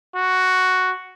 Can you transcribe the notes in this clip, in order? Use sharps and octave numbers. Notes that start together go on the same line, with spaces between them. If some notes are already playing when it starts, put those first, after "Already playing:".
F#4